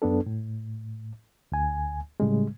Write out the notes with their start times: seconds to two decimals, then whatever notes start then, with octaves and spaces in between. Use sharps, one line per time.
0.02 F#2 B3 D4 A4
0.26 A2
1.52 D2 G#5
2.20 A2 C#3 G3 G#3